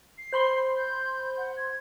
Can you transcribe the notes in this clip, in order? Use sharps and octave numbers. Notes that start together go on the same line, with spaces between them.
C7
C5 B5 C6
G6
F#5
G#6